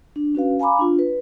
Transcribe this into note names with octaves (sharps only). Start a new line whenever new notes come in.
D4
C#4 F#4 B4 F5
F5 G#5 A#5 B5 D6
D4 F4
B4